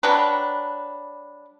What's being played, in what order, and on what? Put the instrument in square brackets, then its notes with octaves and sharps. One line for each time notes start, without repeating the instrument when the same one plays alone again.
[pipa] F#3 G3 D4 B4